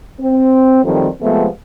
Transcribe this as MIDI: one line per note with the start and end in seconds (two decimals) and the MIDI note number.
0.21 0.81 60
0.84 1.07 42
0.84 1.07 51
0.84 1.07 53
0.84 1.07 55
0.84 1.07 57
0.84 1.07 60
1.21 1.47 48
1.21 1.47 53
1.21 1.47 56
1.21 1.47 57
1.21 1.47 59